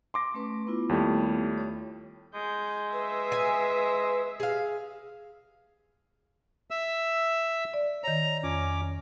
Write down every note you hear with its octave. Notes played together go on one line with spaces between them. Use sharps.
C6 D6 A#6
A3 C#4 B4
B3 E4 F4
D#2 G3 A3
C#5
G#3 G6
B4 E5 E6
G#5
G#4 F5
E5 E6
D5
D#3 C#5 A#5
F2 C#4 D6